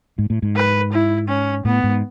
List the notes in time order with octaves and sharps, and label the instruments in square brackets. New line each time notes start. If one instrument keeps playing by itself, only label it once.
[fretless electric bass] G#2
A2
G#2
[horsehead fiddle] B4
E4
C#4
[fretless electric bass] A2 [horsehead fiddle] B3
[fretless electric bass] G#2